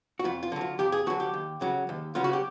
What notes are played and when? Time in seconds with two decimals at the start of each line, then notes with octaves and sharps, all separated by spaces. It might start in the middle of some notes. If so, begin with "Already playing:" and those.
0.19 F#4
0.24 F2 F4
0.43 F4
0.52 D3 F#3
0.61 F4
0.79 F2 G4
0.92 G#4
1.07 D3 F#3 F#4
1.20 G4
1.34 D#2
1.61 C#3 F#3
1.89 D#2
2.15 C#3 F#3 F4
2.24 F#4
2.33 G4